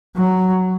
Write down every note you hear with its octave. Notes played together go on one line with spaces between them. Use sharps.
F#3